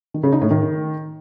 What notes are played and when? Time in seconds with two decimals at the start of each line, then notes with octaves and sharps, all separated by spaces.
0.14 D#3
0.23 C#3
0.32 D#4
0.42 A2
0.51 D#3